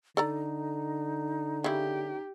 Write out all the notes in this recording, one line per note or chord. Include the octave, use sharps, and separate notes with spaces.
D3 D#4 A4 D5 A#5
C#3 E4 G4